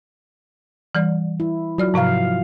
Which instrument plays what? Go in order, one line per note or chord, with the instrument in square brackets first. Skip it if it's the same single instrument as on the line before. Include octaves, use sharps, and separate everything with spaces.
[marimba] E3 G3 D5
[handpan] E4
[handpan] F#3 [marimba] F4 D5 F6
[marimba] G#2 C3 A#5 [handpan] F3 F5